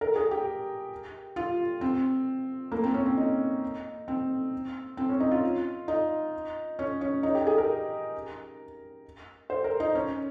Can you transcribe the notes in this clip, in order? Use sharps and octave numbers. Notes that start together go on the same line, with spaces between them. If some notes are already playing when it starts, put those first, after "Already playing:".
A#4
G#4
G4
F4
C4
A#3
C4
C#4
C4
D#4
C4
C4
C#4
D#4
F4
D#4
C#4
C#4
D#4
G4
G#4
A#4
C5
A#4
D#4
C#4